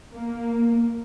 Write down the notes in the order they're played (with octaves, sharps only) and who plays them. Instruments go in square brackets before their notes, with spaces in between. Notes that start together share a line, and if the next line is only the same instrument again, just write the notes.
[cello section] A#3